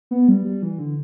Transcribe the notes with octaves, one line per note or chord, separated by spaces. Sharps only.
B3
G3
G3
E3
D3